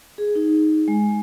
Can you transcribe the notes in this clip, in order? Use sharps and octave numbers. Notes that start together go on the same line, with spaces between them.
G#4
D#4
G#3